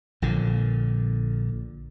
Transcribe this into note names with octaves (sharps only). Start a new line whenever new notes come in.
A#1 A#2 D3